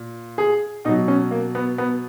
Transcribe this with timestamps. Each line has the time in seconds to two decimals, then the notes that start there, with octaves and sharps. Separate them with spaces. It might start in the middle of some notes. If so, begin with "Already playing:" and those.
Already playing: A#2
0.38 G#4
0.85 B2 D#4
0.89 F#3
1.08 C#4
1.31 A#3
1.55 B3
1.78 B3